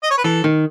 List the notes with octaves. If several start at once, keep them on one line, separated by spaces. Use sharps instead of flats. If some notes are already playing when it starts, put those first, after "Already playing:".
D#5
C#5
B4
E3 A4
D#3